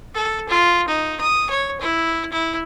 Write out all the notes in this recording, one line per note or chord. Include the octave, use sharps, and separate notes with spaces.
A4
F4
D#4
D#6
C#5
E4
E4